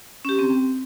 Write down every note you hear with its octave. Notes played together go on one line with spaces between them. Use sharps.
C#4 G4
C4